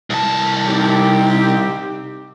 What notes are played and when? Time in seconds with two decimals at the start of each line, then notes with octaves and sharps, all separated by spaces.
0.10 C2 A5
0.67 C4 D#4 G4